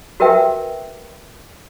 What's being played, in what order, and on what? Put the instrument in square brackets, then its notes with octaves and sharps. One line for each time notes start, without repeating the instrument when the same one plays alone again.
[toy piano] F#4 A#4 B4 E5 G5